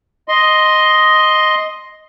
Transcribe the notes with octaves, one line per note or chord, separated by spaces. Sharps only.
D#5 C6